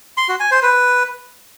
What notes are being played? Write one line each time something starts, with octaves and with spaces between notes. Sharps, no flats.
C6
F#4
G#5
C5
B4